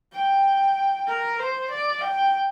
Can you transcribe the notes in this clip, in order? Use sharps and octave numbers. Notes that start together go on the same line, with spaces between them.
G5
A#4
C5
D5
G5